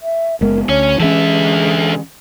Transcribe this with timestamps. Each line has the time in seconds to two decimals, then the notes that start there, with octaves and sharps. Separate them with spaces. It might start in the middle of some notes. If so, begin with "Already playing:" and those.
0.02 E5
0.41 F#1 G#3 B3 A#4
0.69 D2 C#4 C#5
1.00 D3 E3 G#3 C#4 E5